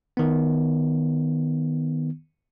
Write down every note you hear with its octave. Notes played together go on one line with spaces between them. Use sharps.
D#3 B3